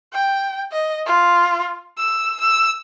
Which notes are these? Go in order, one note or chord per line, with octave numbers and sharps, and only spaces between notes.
G5
D#5
F4
E6
E6